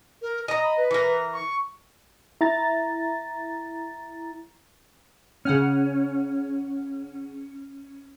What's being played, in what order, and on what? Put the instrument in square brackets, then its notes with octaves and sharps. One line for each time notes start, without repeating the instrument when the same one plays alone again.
[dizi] A#4
[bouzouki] D#5 A#5 [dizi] D#6
[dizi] B5
B4
[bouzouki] E3 A#4
[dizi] C#6
[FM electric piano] E4 A#5 A6
[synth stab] C#3 F#5 F6 [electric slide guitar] C#4